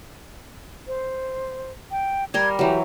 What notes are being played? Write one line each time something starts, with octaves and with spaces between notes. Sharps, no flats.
C5
G5
G3 A#4 C6 G#6
E3 F#3 G4